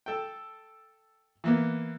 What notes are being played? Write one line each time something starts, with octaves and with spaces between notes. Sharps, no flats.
A4 G5
E3 A#3 B3